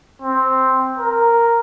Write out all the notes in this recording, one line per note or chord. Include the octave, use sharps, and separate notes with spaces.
C4
A#4